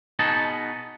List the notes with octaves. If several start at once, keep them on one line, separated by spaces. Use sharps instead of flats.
B2 B3 D#4 G#4 A5